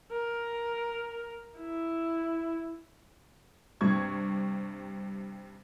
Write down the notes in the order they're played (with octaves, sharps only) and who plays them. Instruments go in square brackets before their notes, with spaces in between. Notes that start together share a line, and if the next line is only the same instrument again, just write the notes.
[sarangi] A#4
E4
[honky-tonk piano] G2 C3 C#6 G#6